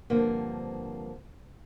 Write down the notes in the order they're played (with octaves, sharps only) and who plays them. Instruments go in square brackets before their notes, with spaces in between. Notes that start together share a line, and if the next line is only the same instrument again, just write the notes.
[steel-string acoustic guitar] G2 D3 F3 A#3 C4